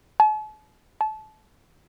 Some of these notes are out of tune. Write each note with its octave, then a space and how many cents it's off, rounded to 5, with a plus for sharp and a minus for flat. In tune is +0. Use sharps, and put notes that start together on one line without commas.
A5 -45
A5 -25